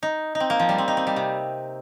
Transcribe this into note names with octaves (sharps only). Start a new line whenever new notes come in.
D#4
D#4
C4
A#3
F3
G3
C4
D#4
C4
G3
C3